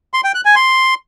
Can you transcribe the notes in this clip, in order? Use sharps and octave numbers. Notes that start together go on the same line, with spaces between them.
C6
G5
F#6
G#5
C6